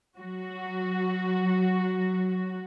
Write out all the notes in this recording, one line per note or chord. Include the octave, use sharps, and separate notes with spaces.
F#3 F#4